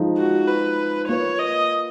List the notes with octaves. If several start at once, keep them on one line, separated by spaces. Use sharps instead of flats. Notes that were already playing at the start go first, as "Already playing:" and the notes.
Already playing: F3 G#3 D#4
F#4
B4
A#3 F4 B4 C#5
D#5